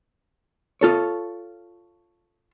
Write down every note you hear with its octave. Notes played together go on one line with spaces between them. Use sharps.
F4 A4 C#5